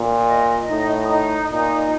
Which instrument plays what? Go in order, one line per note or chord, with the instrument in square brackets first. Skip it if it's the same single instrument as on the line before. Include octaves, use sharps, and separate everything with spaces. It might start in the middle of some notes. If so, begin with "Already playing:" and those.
Already playing: [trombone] A#2
[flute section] D#5
[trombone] A2 [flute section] D#4
[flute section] D#4
[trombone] A#2 [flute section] D#4